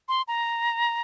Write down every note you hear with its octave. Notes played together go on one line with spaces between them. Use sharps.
C6
A#5